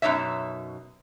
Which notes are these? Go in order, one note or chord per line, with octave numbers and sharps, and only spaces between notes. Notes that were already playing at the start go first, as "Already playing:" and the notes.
F#2 B2 D#4 C#5 E5